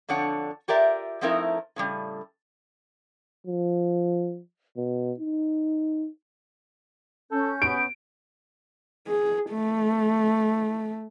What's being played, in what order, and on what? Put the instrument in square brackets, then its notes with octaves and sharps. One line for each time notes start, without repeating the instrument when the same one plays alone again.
[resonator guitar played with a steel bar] F2 D3 D4 C#5 F#5
F4 G4 A#4 D5 E5
F3 A3 C4 D#4 E4 A#4
A2 C#3 G3
[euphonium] F3
B2
D#4
[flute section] C#4 G6 [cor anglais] A4
[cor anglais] B3 [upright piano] D7
[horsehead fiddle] G#4
A3